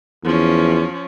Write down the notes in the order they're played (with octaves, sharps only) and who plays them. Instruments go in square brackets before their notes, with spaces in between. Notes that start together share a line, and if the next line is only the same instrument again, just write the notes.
[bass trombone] E2 [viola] F3 C#4